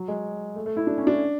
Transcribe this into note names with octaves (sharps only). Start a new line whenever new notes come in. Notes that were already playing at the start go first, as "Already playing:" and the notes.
Already playing: F#3
G#3
A3
A3
E4
D4
C#4
D4